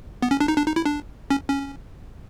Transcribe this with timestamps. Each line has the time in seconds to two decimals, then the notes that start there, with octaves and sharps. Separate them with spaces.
0.22 B3
0.31 C#4
0.40 D4
0.48 D#4
0.58 D4
0.67 D#4
0.76 E4
0.86 D4
1.30 C#4
1.49 C#4